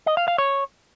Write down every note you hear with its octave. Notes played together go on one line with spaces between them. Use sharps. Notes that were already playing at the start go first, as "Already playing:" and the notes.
D#5
F5
F5
C#5